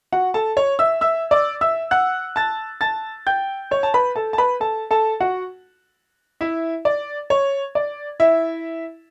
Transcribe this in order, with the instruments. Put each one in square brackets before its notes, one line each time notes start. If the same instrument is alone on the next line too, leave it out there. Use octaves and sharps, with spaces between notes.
[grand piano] F#4 F#5
A4 A5
C#5 C#6
E5 E6
E5 E6
D5 D6
E5 E6
F#5 F#6
A5 A6
A5 A6
G5 G6
C#5 C#6
A5
B4 B5
A4 A5
A5
B4 B5
A4 A5
A4 A5
F#4 F#5
E4 E5
D5
C#5
D5
E4 E5